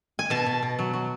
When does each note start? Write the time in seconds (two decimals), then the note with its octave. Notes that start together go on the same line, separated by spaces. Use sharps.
0.19 G#5
0.30 B2 A5
0.47 B2
0.63 B2
0.79 F#3
0.93 F#3